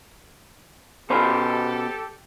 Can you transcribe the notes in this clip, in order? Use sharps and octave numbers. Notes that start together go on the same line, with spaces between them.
B2 G4 A4 C5 B5